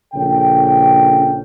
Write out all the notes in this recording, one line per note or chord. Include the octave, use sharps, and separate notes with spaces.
A#1 C#3 C#4 A4 G5